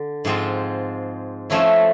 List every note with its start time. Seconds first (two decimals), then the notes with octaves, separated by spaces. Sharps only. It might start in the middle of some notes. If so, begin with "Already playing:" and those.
Already playing: D3
0.25 G#2 F3 G#3 C4 F4
1.50 F3 A3 C#4 E4